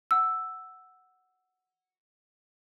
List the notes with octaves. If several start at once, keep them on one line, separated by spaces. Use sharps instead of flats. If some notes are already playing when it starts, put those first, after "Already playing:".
F#5 E6